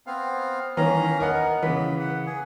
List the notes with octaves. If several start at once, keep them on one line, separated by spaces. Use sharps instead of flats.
B3 C4 F5
D#3 E3 B3 C#4 F5 A#5
B3 A#4 D#5 F#5
C#3 E3 B5
F#5
G#4